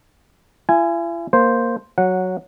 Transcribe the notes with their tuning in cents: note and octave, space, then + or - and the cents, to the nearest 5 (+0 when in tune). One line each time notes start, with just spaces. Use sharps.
E4 +45 G#5 +0
A#3 +0 C5 +0
F#3 +0 F#5 -10